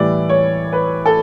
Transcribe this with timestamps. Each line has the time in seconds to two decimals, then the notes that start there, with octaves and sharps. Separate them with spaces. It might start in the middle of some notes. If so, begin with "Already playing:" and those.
Already playing: A2 E3 G3 D5
0.29 C#5
0.73 B4
1.05 A4